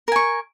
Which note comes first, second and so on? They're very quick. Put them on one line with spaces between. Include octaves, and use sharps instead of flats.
A#4 G#5 C#6